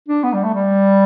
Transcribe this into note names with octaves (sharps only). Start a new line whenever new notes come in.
D4
B3
G3
A3
G3